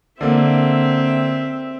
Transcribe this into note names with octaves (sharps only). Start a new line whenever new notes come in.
D3 A#3 C4 E5